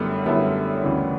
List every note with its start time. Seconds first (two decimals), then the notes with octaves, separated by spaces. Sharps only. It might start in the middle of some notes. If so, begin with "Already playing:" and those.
Already playing: F#2 D3 G3 A3 B3 E4
0.26 F#2 D3 G3 A3 B3 E4
0.83 D2 C#3 E3